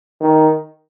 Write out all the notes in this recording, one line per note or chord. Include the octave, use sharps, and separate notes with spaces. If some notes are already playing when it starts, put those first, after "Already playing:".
D#3